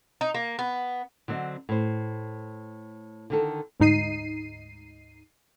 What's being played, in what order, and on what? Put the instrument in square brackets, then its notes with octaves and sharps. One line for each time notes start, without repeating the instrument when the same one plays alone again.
[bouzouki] D#4
A#3
B3
[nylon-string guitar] D3 F#3 C4 D#5
A2 C5
D3 D#3 A4
[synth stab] D2 G#2 D#4 C7 D#7